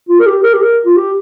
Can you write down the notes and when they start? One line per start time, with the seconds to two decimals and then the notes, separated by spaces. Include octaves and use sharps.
0.08 F4
0.19 A#4
0.26 G4
0.43 A#4
0.53 G4
0.62 A#4
0.85 F4
0.96 G4